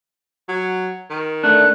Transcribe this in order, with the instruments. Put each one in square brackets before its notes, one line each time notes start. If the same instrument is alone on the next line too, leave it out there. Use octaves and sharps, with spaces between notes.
[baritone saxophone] F#3
D#3
[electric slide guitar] A3 D4 [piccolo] F#6